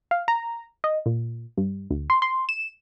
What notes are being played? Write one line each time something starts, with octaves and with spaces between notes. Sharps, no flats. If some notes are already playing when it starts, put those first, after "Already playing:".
F5
A#5
D#5
A#2
G2
D2
C6
C6
E7